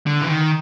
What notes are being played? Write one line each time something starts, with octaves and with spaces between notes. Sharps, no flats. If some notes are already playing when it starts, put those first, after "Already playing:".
D3
E3
D#3